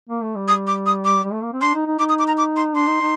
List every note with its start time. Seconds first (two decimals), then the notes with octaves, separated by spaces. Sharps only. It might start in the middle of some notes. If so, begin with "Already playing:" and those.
0.09 A#3
0.22 A3
0.35 G3
0.48 D#6
0.67 D6
0.86 D#6
1.05 D6
1.23 G3
1.32 A3
1.43 A#3
1.53 C4
1.61 D4 C6
1.74 D#4
1.86 D#4
1.99 D#4 D6
2.09 D#6
2.19 D6
2.28 A#5
2.38 D6
2.56 C6
2.75 D4 C6
2.87 D#4
3.01 D#4